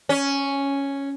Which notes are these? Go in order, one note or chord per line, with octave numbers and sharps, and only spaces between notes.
C#4